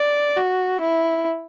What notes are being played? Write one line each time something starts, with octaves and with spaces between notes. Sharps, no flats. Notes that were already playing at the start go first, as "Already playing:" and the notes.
Already playing: D5
F#4
E4